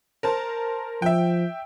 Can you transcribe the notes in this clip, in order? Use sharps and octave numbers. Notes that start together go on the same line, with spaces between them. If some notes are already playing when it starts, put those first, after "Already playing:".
A#4 C5 A5
F3 E5 G5